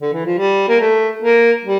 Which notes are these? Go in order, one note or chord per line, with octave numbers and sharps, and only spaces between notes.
D3
E3
F3
G3
A#3
A3
A#3
G3